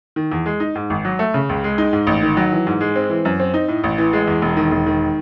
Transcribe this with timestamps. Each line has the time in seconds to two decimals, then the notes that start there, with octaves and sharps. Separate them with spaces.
0.16 D#3
0.32 E2
0.46 G#3
0.60 D#4
0.75 G#2
0.90 G#1
1.05 F#3
1.19 A3
1.34 C#3
1.49 C#2
1.64 G#3
1.78 D#4
1.93 G#2
2.07 A1
2.22 D#3
2.37 F#3
2.52 E3
2.67 G#2
2.81 G#3
2.96 C4
3.10 E3
3.25 F#2
3.40 C4
3.54 D#4
3.68 A2
3.84 A1
3.98 E3
4.13 G#3
4.27 E2
4.42 E1
4.57 D#3
4.71 E1
4.86 D#3